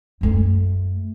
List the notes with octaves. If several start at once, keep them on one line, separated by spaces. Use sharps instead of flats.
F#2 A3